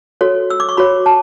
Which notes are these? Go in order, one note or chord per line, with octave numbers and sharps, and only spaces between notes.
F#4 A4 C#5
E6
D6
C#6
F#4 C#5 B5
A5